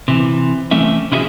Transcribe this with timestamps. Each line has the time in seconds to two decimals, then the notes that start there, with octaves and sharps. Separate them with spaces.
0.08 C3 E3
0.71 E3 A3 C4 C#4 E5
1.12 C3 C#4 E4 F#4 G#4 E5